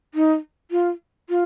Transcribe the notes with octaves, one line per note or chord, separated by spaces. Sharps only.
D#4
F4
F4